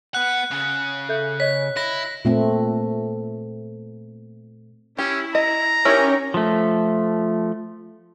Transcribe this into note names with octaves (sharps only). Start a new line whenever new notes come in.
B3 F#5 F#6
C#3
A4 E5 G6
C#5 D#5 B6
E4 A#6
A#2 A3 C4
C#4 E4 G4
D#5 A#5
C#4 D#4 E4 G4 A#4
F3 A3